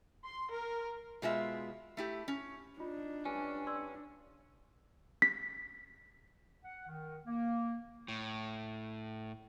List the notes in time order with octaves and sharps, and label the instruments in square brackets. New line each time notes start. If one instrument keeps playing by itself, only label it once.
[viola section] C6
A#4
[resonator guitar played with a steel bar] B2 G#3 F4 E5
A3 E4 G4
C#4
[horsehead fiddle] D4 [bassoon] D#4 [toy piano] F4
[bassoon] G2 [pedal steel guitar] C#4 [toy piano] G#5
[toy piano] D5 C6 E6
[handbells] B6
[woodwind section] F#5
D#3
A#3
[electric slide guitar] A2